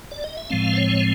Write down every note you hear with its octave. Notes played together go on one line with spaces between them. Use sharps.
D5
D#5
E5
A2 F3 G#3 C4 F5
C5
C#5